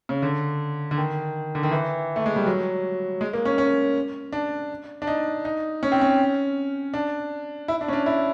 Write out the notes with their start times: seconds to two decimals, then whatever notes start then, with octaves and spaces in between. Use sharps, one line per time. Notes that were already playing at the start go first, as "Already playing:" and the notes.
0.09 C#3
0.22 D3
0.91 D3
0.98 D#3
1.55 D3
1.63 D#3
1.72 E3
2.16 A3
2.26 G#3
2.36 G3
2.47 F#3
3.21 G#3
3.33 A#3
3.45 C#4
3.58 C#4
4.32 D4
5.02 D4
5.07 D#4
5.45 D#4
5.83 C#4
5.92 C4
6.01 C#4
6.94 D4
7.68 E4
7.81 D4
7.88 C#4
7.93 D4
8.06 E4